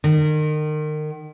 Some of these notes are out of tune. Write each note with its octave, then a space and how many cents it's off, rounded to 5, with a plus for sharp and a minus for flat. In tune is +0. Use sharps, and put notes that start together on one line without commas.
D#3 -30